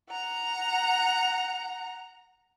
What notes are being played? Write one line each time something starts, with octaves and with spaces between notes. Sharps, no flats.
F#5 A#5